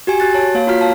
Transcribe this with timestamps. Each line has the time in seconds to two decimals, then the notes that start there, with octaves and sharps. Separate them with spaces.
0.07 F#4 G4 G#5
0.20 F#4 F#6 A6
0.34 C#5 A5
0.55 A#3 C#5 F5
0.67 F4 F#4 A#5 F6 B6
0.80 F5 A5 F6